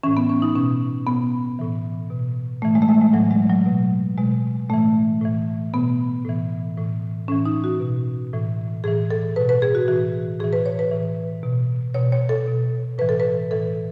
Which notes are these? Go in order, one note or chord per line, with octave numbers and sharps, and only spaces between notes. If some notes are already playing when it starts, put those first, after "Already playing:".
A2 E3 C#4
B3
C#4
D#4
B2 C#4
B2 B3
A2 E3
B2
A2 E3 A3
G#3
A3
G#3
G#3
A2 E3 F#3
G#3
F#3
B2
B2 G#3
A2 E3 A3
A2 E3
B2 B3
A2 E3
A2 E3
A2 E3 C#4
D#4
F#4
B2
A2 E3
A2 E3 G#4
A4
B2 B4
B4
G#4
F#4
A2 E3 F#4
A2 E3 G#4
B4
C#5
B4
A2 E3
B2
B2 C#5
C#5
A4
B2
A2 E3 B4
A4
B4
A2 E3 A4